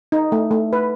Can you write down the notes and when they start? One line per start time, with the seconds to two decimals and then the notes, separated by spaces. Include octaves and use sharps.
0.12 D#4
0.32 A3
0.51 A3
0.73 B4